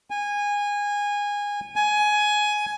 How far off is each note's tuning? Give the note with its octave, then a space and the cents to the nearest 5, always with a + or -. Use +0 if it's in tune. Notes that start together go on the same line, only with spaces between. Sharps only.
G#5 -20
G#5 +15